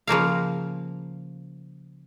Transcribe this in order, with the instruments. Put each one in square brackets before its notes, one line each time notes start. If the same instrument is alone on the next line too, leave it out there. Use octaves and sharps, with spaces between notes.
[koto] C#3 F3 A#3 F5